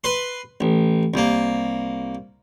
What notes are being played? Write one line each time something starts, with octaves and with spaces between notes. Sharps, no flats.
B4 C6
A1
C2 A#3